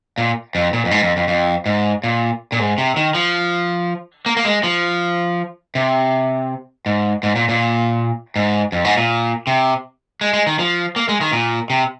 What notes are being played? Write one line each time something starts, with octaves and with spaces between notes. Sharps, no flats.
A#2
F2
A#2
F2
G#2
F2
F2
F2
G#2
A#2
A#2
G#2
C3
D#3
F3
A#3
A#3
G#3
F3
C3
G#2
G#2
A#2
A#2
G#2
F2
G#2
A#2
C3
G#3
G#3
D#3
F3
A#3
G#3
D#3
A#2
C3